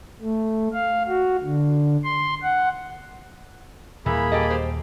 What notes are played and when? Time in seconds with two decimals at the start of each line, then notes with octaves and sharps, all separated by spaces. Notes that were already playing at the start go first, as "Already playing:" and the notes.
0.21 A3
0.73 F5
1.08 F#4
1.43 D3
2.04 C6
2.42 F#5
4.06 D#2 A#2 E3 G3 A#3 G#4 B5
4.32 G4 A4 D#5
4.50 G4 C5